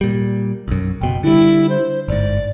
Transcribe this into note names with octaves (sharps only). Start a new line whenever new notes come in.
A#2 G3
B1 F#2
F#1 B2 G5
D3 G3 E4
C5
G1 G#2 D5